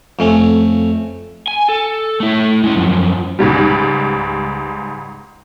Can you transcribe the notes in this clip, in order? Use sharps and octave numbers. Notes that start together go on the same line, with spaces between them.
F2 A3 C#4
G#5
A4
A3 E4
G#3 C#4
F#2 F3
C#2 G#2 G3